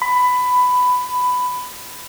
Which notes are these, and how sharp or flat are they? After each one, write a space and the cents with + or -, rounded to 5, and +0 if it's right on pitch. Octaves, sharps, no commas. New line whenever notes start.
B5 +15